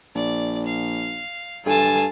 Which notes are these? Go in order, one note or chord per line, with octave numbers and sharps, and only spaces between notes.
A#1 D5
F5
G2 F4 A4 G#5 A5